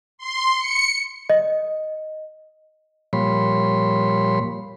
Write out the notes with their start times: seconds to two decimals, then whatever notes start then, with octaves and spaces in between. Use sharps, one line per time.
0.18 C6
0.58 C#7
1.30 D#5
3.13 A#2 F3 G3 C#5 B5 C6